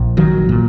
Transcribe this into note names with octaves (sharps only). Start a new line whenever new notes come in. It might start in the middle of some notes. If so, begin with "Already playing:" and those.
Already playing: A#1 A#2
D#3 F#3
A#2